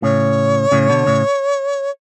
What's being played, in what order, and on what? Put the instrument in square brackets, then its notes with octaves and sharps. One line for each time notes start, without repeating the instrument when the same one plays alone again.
[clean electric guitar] A2 C#3 [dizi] C#5
[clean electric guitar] A2 C#3
B2 D3
A2 C#3